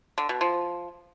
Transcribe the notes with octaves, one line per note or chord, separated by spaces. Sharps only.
D3
B2
F3